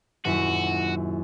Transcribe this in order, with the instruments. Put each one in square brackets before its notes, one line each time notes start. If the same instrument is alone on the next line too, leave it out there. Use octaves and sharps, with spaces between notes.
[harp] D#1 F#2 E4 [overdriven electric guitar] F#4